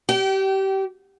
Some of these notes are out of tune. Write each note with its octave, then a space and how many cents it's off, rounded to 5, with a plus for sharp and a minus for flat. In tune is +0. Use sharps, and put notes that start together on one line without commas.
G4 -25 G5 -35